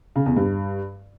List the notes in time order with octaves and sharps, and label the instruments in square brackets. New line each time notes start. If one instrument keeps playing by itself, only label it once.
[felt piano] C#3
E2
G2